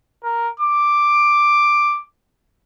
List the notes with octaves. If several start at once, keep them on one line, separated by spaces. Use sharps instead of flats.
A#4
D6